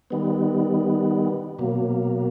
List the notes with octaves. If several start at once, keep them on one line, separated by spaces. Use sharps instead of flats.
D#3 G3 B3
B2 F#3 A#3